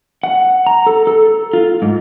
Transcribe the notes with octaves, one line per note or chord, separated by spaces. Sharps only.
F#5
A#5
A4
A4
F4
G#2